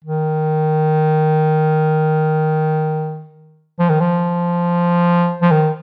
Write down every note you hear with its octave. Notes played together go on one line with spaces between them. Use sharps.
D#3
F3
D#3
F3
F3
D#3